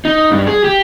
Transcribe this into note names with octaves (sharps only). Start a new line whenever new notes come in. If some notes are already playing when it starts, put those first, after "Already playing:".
D#4
G2
G#4
G4